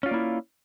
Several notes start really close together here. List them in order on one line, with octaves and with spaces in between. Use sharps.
C#4 F4 D5 A#3 E4